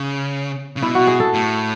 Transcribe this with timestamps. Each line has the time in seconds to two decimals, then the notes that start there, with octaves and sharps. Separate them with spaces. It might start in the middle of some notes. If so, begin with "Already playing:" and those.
Already playing: C#3
0.77 C#3
0.82 B2 E4
0.95 F#4
1.07 G#4
1.20 A4
1.33 A2